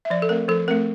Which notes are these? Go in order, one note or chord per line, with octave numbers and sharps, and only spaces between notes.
E5
F3 D5
A4
A3 C4 A#4
F3 A4
A3 C4 A#4